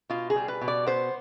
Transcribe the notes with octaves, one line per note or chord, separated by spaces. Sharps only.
B2 F4
G#4
G3
B4
B2
D5
B3 C5